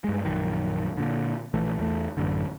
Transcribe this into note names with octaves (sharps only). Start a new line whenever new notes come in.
G2 G#3
A#1 F#2 D#3
A#2 D3
A#1 E3 A3
E2 A3
A1 F#2 D3